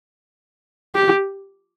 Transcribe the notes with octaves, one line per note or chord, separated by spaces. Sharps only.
G4